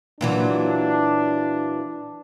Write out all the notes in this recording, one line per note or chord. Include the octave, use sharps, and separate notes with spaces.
A#2 E3 F#3 D4